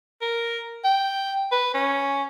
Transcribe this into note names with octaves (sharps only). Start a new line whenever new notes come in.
A#4
G5
B4
C#4